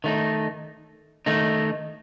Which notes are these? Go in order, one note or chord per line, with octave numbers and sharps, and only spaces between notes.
D#3 A3 D#4
D#3 A3 D#4